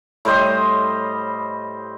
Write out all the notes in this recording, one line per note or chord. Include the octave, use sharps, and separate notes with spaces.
A2 G3 C5 D#5